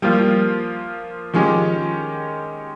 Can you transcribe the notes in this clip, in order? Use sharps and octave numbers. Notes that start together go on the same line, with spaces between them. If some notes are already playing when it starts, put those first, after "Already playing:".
F3 G3 A#3 F4
D#3 F3 G#3 C#4 G4